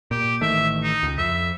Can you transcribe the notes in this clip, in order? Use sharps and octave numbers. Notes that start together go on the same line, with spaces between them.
A#2 G4
A1 D#3 A3 E5
D#4
C#2
F2 E5